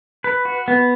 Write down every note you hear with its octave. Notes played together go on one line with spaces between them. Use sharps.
B4
F#4
B3